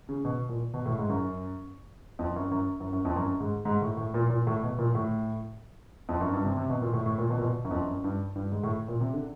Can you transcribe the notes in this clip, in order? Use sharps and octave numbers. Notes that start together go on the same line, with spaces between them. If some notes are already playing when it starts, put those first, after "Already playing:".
C#3
B2
A#2
B2
A2
G#2
F#2
F2
F#2
F#2
F#2
F#2
F2
F#2
G#2
G#2
A2
A2
A#2
A#2
A2
B2
A#2
A2
F2
F#2
G2
C3
C3
B2
A#2
A2
A2
A#2
B2
A#2
B2
F#2
F2
F#2
G2
G2
G#2
A2
A#2
C3
D3